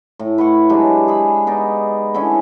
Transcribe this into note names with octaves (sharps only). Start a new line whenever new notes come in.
A2
B4 F#5 C6 C#6
F#3 G#3 D4 G4
G#4 B5
B3 D#4 D5
D3 C#4 E4 G#5